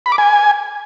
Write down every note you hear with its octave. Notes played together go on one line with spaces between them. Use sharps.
B5
D6
G#5